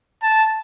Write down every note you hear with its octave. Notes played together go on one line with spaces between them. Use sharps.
A5